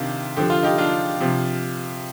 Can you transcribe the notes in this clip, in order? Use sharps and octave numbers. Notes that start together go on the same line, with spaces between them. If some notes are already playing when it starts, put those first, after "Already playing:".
Already playing: C3 D#3 D4 F4
D3 F3 G4
F4
D#4 G4
D4 F4
C3 F3